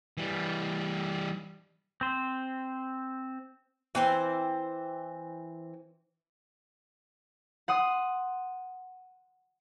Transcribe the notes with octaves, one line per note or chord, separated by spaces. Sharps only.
E3 G3
C4 C5
E3 C4 C5
F#5 C6 D#6